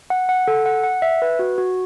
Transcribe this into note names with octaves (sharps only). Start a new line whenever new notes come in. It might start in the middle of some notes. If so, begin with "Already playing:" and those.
F#5
F#5
A4
F#5
F#5
E5
B4
F#4
F#4